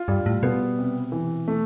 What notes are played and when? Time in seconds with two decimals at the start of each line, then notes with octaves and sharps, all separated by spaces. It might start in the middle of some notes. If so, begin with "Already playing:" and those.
Already playing: F4
0.08 G2 G3
0.26 A2
0.43 B2 B3
0.79 C3
1.12 E3
1.48 A3